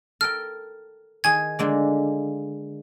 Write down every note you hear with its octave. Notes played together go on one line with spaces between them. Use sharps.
A4 A#4 G5 F6
D#3 G#4 G#5 G#6
D3 G#3 A#3